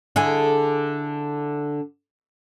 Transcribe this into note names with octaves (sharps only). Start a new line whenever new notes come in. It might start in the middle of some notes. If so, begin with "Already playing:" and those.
D3 E4 G#4